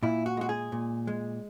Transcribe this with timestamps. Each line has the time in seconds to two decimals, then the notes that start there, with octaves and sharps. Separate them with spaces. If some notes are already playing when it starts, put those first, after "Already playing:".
0.03 A#2 E4
0.26 F#4
0.37 G#3 F#4
0.49 G#4
0.72 A#2
1.07 G#3